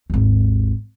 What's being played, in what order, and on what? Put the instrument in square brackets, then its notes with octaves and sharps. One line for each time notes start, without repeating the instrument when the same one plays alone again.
[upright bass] G#1 D#2